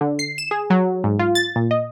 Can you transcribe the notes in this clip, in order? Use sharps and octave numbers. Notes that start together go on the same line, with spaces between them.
D3
C7
E7
G#4
F#3
G#2
F4
A6
A#2
D#5